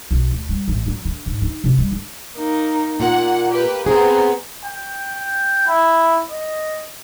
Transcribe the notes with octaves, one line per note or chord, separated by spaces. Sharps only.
B1
D2
G3
A1
F#3
D3
G#2
D#4
C3
G3
D3
A#3 D#4
A#2 A#3 F#5
G4 B4
B3 C4 G#4 A#5
G5
E4
D#5